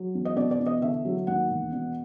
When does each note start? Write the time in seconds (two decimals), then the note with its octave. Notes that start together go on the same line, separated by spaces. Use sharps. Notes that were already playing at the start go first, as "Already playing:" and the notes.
Already playing: F#3
0.15 E2
0.25 D#5
0.36 B2 D5
0.51 D5
0.59 E2
0.66 D#5
0.81 D3 E5
1.05 F#3
1.27 D#2 F#5
1.50 E1
1.72 B2